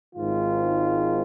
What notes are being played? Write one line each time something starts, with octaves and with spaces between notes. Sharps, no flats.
G#1 G#2 D#3 F4